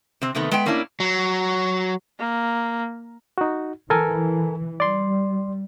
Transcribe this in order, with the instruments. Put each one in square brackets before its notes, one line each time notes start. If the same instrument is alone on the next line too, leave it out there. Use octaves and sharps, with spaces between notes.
[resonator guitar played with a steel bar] C3 C4
C3 D#3 A3 B3
G#3 B3 G5
A2 A#3 C#4 D4 E4
[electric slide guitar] F#3
[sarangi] A#3
[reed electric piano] D#4 F#4
[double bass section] E3 [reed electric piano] A4 A#4 G#5
[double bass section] G3 [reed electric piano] D5 C6